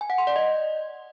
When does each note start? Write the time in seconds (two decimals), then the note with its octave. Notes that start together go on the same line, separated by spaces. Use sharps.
0.01 G#5
0.10 F#5
0.18 C6
0.27 D5
0.36 D#5